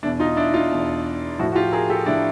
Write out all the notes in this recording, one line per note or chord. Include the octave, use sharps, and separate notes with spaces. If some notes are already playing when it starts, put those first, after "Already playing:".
E2 B2 D4 E4
D#4 F4
D4 E4
D#4 F4
E2 B2
A2 F3 E4 F#4
F#4
F4 G4
G#4 A#4
G4 A4
A2 F3 D4 E4